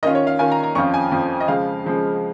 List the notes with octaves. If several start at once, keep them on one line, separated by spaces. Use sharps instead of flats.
D#3 C#4 F4 D#5
C#5
F5
D#3 C#4 F4 G#5
A#5
A#5
F2 F3 C#4 F4 C#6
G#5
F2 F3 C#4 F4
D#5
C#3 F3 G#3 F5
C#3 F3 G#3